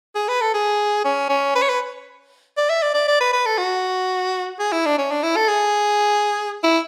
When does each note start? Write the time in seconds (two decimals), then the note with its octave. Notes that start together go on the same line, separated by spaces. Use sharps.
0.15 G#4
0.28 B4
0.41 A4
0.54 G#4
1.05 C#4
1.29 C#4
1.55 B4
1.62 C#5
1.69 B4
2.57 D5
2.70 E5
2.82 D5
2.94 D5
3.08 D5
3.21 B4
3.33 B4
3.46 A4
3.58 F#4
4.59 G#4
4.72 E4
4.86 D4
4.98 C#4
5.11 D4
5.23 E4
5.36 A4
5.48 G#4
6.63 E4